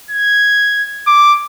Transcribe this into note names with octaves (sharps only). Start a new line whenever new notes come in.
G#6
D6